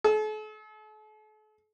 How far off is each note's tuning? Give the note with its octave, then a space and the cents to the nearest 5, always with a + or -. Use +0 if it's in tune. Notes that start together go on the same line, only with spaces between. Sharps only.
A4 -45